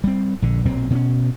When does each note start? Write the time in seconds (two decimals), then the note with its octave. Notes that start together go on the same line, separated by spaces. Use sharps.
0.04 G3 C4
0.42 A#1 D3
0.65 B1 A#2 F#3 C4
0.90 B2 C4 C#4